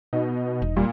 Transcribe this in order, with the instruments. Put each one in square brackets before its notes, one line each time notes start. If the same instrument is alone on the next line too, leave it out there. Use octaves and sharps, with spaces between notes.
[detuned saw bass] B2 [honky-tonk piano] D#4
[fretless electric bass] E1
[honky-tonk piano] A#2 [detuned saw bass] G3